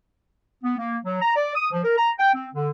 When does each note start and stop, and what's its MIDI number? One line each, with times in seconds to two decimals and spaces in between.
0.64 0.77 59
0.79 0.97 58
1.05 1.19 54
1.22 1.34 82
1.36 1.53 74
1.55 1.68 87
1.72 1.81 53
1.84 1.95 70
1.97 2.11 82
2.19 2.32 79
2.34 2.48 60
2.55 2.70 50